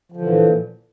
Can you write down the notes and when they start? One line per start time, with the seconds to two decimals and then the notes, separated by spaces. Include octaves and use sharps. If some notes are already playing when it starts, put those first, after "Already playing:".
0.12 F3
0.16 D3
0.21 E3
0.25 A#2